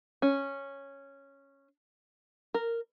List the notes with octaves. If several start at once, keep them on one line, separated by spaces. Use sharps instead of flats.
C#4
A#4